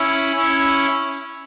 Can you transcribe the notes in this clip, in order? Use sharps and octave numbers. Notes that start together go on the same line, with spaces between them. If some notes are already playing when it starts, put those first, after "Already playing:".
Already playing: C#4 E4
C#4 E4